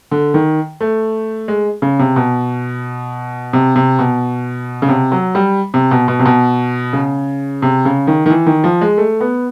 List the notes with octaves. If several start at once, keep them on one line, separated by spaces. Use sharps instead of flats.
D3
D#3
A3
G#3
C#3
C3
B2
C3
C3
B2
C#3
C3
F#3
G3
C3
B2
B2
C3
B2
C#3
C3
C#3
D#3
D#3
E3
D#3
F3
G#3
A3
B3